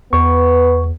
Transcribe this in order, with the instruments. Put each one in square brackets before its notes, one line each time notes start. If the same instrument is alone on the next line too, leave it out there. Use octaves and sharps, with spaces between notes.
[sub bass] E2 [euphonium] B3 [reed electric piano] B4 C#6